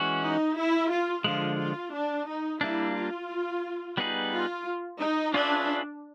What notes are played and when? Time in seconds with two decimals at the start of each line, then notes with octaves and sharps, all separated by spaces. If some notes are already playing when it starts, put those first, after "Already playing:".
Already playing: E3 G#3 C#4 F#4
0.22 D#4
0.56 E4
0.90 F4
1.24 D3 F3 G#3 F4
1.58 F4
1.94 D4
2.27 D#4
2.61 G3 A#3 D4 E4
2.95 F4
3.97 G3 B3 D#4 G#4 B4
4.32 F4
5.00 D#4
5.34 C#4 D4 F4 G#4 B4 E5